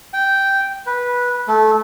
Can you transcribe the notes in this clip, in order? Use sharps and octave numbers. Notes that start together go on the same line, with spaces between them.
G5
B4
A3